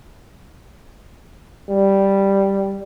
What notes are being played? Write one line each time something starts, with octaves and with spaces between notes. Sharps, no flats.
G3